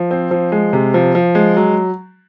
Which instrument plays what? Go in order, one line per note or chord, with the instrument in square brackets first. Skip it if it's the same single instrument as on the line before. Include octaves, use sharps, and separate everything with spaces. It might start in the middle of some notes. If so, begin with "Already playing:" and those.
Already playing: [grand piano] F3
C4
F3
G#3
C3
F3
F3
G#3
F#3